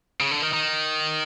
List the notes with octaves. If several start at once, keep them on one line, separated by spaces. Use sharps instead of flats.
C#3
D3
D#3
D#3